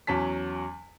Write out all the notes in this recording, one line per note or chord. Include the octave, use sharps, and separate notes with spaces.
E2 F#3 C#4 A5 B6